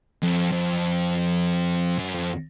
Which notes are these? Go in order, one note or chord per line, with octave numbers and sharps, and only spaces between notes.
F2
F2
F#2
F2